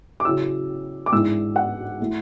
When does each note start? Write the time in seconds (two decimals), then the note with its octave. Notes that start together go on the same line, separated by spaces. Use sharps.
0.20 D6
0.25 C#3 F#3 C#4 E4 E6
1.06 D6
1.12 G#2 E3 G#3 D4 E6
1.56 F#5
2.00 E3 A3